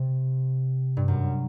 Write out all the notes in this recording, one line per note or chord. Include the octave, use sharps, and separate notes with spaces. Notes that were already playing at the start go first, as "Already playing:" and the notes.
Already playing: C3
G2
F#2